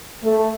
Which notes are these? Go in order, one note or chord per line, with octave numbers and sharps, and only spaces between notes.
A3